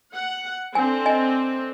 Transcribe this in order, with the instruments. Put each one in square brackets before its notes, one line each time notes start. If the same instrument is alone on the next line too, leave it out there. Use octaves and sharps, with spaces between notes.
[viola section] F#5
[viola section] D3 C4 [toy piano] G#5
[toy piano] D#5 G#5